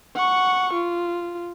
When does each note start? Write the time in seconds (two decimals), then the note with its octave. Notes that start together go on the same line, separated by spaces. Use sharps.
0.16 F#5 C#6
0.73 F4